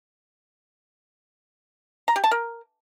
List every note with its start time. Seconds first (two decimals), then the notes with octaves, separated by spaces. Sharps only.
2.08 A#5
2.16 G4
2.24 A5
2.31 A#4